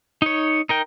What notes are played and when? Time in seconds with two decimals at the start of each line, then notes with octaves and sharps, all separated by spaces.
0.22 D#4 C#5
0.69 D#4 A#4 G5